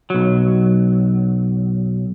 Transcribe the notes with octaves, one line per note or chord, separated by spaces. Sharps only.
B1 F#3